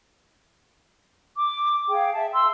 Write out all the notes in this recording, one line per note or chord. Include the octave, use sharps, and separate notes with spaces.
D6
G#4 F5 G5
E5 A5
C6 E6